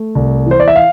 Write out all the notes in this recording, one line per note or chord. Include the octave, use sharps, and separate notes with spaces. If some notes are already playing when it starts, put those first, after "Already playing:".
Already playing: A3
C2
E3 C5
D5
E5
F5